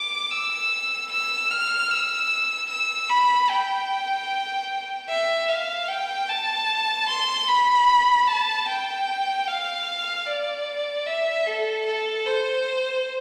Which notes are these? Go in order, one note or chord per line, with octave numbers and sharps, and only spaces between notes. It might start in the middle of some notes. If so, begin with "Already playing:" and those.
Already playing: D6
E6
E6
F6
E6
E6
B5
G5
E5
F5
G5
A5
C6
B5
A5
G5
F5
D5
E5
A4
A4
C5